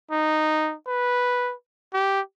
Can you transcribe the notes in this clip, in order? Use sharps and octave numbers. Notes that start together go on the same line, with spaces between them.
D#4
B4
G4